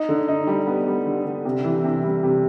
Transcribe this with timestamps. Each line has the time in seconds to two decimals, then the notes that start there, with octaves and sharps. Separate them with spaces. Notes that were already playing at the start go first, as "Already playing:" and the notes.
Already playing: D#4
0.09 D3
0.28 D#4
0.47 G3
0.67 B3
0.87 G3
1.06 D3
1.26 D3
1.45 C3
1.64 E3
1.84 C3
2.04 G3
2.23 C3